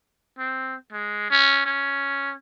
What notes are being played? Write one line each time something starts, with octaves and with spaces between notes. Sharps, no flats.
C4
G#3
C#4
C#4